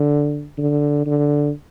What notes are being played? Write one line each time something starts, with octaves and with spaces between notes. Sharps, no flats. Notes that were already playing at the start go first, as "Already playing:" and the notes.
Already playing: D3
D3
D3